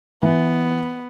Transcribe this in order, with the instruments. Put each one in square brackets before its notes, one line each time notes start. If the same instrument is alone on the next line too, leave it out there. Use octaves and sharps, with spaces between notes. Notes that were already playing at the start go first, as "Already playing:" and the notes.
[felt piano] E3 [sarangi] B3